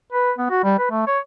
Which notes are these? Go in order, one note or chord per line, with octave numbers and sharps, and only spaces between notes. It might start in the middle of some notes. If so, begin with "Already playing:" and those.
B4
B3
F#4
G3
B4
A3
C#5